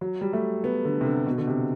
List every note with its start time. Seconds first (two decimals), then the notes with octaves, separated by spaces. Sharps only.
0.01 F#3
0.21 G3
0.33 A3
0.64 B3
0.85 D3
1.01 C3
1.06 D3
1.26 B2
1.38 D3
1.48 C3